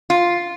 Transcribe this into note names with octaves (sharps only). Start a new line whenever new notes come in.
F4